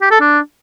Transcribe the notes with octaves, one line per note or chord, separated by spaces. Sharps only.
G4
A4
D4